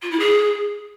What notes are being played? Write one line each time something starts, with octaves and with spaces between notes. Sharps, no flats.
F4
E4
G#4